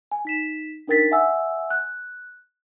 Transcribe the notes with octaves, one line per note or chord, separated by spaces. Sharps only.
G#5
D#4 B6 E7
D4 D#4 A#4 G5 A6 B6
E5 F#5 G#5 E6
F#6